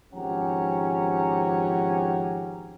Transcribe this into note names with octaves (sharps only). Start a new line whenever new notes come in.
G#1 F3 C#4 G4 F#5 A#5